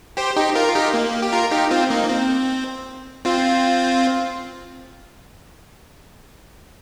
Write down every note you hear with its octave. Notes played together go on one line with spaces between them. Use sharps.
G4 C5
D#4 G4
F4 A#4
F4
D#4 G4
A#3
G4
F4 A#4
D#4 G4
C4 F4
A#3 D#4
A#3
C4
C4 F4